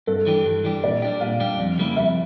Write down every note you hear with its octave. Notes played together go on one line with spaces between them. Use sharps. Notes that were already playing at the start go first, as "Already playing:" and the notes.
G2 A4
E3 G3 D4 G4
G2
E3 G3 D4 G4
A#2 D5
G3 D4 G4
A#2 F5
G3 D4 G4
F2
C#3 G3 A#3 E4
F2 E5